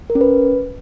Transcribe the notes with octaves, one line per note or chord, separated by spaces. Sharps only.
A#4
C#4
B4